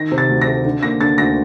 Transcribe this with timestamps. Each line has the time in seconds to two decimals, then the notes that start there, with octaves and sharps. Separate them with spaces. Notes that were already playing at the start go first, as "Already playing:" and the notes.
Already playing: D#3 A#6
0.12 C3
0.18 A6
0.29 D2
0.42 A#6
0.47 A3
0.65 D3
0.83 A#3 A#6
1.01 D3 A6
1.18 D2 A#6